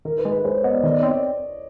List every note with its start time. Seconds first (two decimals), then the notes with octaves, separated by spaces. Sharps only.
0.05 D#3 A#4
0.18 B4
0.25 G#3
0.31 B4
0.44 G#3 C5
0.55 C#5
0.64 B3 D#5
0.74 D5
0.83 D#3 D#5
0.92 D5
1.01 C4 C#5
1.09 D5